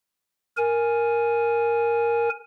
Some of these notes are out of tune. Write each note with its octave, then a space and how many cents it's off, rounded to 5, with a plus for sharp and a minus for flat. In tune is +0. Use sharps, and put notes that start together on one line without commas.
A#4 +0 G#5 +0